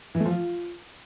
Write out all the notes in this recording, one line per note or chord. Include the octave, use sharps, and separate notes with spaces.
E3
A3
F3
F4